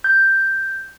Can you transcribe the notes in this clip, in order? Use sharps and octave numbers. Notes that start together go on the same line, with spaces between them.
G6